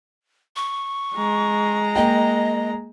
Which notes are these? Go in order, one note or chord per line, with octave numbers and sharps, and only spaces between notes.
C#6
G#3 A#5
A#3 D#5 G5